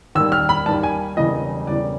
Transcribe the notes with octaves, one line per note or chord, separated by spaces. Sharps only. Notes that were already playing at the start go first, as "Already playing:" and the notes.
D#2 D#3 G3 E6
F6
B5
D#2 D#3 G3 A5
G#5
E1 E2 C#3 E3 G3 D#5
E1 E2 C#3 E3 G3 D5